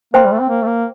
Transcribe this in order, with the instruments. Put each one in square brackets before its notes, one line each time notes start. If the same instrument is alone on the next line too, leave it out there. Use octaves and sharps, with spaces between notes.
[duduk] A#3 [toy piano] C5 G5 C6
[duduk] G3
A3
C4
A#3
A3
A#3